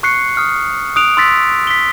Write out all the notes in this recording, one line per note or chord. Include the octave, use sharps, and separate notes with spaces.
C#6 F#6 C7 C#7
D#6 F6
D#6 F#6 D7 F7
C6 E6 A6 B6
B6 G7